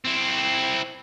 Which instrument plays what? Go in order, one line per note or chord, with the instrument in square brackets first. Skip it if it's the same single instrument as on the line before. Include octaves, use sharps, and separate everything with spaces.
[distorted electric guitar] C4 E4